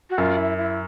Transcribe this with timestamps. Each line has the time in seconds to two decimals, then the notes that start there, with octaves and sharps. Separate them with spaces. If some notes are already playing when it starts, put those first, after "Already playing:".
0.10 F#4
0.18 F#2 F4
0.38 E4
0.57 E4